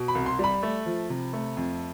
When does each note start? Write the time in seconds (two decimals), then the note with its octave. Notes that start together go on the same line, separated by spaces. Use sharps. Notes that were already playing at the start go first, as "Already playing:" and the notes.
Already playing: B2
0.08 B5
0.15 C2
0.26 C6
0.39 G3 B5
0.63 A3
0.86 F3
1.10 C3
1.33 A3
1.57 F2